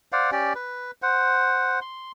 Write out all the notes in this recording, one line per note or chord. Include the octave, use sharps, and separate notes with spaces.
C5 D5 F5 F#5
C#4 G4 D5
B4
C5 F#5
C6